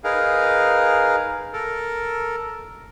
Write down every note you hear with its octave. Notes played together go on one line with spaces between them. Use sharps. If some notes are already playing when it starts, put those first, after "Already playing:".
D#4 G#4 A#4 B4 F5
A4 A#4